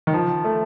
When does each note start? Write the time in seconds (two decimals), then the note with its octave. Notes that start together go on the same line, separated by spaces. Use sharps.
0.07 D#3
0.14 F3
0.44 A3